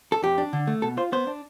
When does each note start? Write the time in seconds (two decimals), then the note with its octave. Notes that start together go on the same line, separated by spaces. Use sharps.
0.12 A4
0.23 F2 G4
0.38 D4
0.53 D3
0.67 A3
0.82 B2 A4
0.97 F4 C5
1.12 B3 C5
1.27 D4